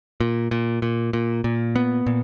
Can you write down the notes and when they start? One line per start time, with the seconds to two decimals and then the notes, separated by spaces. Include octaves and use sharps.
0.20 A#2
0.51 A#2
0.82 A#2
1.13 A#2
1.44 A#2
1.76 B3
2.06 A#2